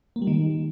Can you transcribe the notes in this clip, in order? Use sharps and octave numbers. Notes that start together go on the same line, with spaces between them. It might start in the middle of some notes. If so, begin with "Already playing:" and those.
A#3
G3
D#3